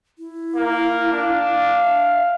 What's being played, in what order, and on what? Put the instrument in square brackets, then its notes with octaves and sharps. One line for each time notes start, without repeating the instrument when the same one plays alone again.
[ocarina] E4
[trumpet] A#3
[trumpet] D4 [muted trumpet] F5
[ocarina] E5